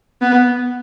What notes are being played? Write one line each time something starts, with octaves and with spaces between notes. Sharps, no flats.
B3